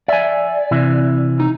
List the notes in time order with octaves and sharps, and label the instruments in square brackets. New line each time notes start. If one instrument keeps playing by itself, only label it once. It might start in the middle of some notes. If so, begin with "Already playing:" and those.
[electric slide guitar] D5 [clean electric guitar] E5 G#5
[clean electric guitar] C3 E3 E4
[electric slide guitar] D#4